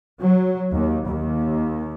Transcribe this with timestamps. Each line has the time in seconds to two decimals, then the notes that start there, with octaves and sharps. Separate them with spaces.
0.21 F#3
0.74 D#2
1.07 D#2